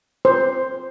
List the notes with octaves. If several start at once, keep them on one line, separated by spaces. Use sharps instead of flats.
C5